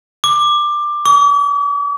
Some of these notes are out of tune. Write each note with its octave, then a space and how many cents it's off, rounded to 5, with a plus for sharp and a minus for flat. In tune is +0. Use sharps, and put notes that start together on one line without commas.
D6 +15
D6 -45